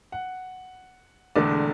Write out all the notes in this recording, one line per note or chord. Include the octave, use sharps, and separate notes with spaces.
F#5
E1 E2 D3 A3 D4 D5